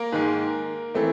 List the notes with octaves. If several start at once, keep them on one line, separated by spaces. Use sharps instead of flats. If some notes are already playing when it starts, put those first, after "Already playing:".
Already playing: A#3 A#4
G#2 D#3 G#3
E3 A3 C4